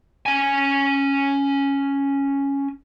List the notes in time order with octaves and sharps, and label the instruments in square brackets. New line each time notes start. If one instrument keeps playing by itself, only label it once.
[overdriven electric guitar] C#4 G#5